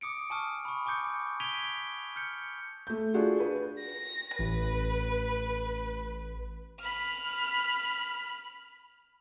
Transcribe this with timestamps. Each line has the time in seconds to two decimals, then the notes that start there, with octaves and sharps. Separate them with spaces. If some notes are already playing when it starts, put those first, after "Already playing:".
0.01 D6 D#6 C#7 D7
0.30 G#5 A5 C#6 D#6 F6
0.65 B5 C#6
0.86 G#5 C#6 D6 G6 C#7
1.40 G#6 B6 D7 D#7 F7 G7
2.16 F6 G6 C#7
2.87 A3 G6
3.14 D4 F4 F#4 G#4
3.40 B4
3.80 A#6
4.39 A1 B4
6.80 B5 F6